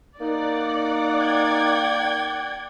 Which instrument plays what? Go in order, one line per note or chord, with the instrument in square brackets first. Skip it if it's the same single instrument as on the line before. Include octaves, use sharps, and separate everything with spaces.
[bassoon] A#3 [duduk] D#4 [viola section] D5 F#5
[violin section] G5 G#6